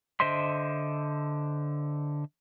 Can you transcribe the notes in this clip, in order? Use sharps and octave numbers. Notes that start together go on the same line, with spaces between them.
D3 C5 D#5 E5 C6